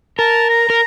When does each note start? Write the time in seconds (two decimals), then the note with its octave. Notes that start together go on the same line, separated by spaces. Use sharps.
0.19 A#4 A5
0.50 A#5
0.70 A#4